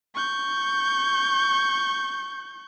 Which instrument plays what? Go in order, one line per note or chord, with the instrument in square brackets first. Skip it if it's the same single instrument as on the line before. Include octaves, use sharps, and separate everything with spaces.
[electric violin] C#6 G6